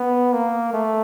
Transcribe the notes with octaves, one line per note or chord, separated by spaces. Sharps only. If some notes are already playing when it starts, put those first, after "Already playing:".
Already playing: B3
A#3
A3